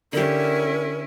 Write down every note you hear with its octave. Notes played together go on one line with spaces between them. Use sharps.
D3 C#4 E4 G4 A#4